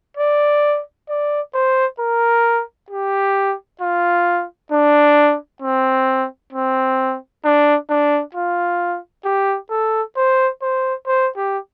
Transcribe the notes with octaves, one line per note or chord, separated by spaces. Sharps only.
D5
D5
C5
A#4
G4
F4
D4
C4
C4
D4
D4
F4
G4
A4
C5
C5
C5
G4